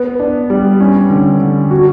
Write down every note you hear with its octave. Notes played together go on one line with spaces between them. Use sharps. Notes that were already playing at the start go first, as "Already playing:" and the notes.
Already playing: B3
D4
G3
C#4
D3
D3
F#4